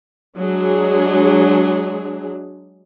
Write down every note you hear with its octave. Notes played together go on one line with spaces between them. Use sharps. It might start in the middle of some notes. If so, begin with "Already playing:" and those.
F#3 G#3 D4 G#4